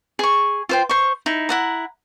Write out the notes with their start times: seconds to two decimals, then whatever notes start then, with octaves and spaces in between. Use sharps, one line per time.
0.19 G#4 C#6
0.69 F4 C5 G5
0.89 C5 C#6
1.26 D#4 E4
1.49 E4 F#5 A#5